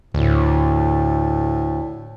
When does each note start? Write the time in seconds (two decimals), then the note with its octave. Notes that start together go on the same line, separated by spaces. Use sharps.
0.14 D2 A2